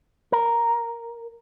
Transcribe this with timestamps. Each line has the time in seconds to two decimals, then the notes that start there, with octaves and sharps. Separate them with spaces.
0.32 A#4